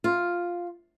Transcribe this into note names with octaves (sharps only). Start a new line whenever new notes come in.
F4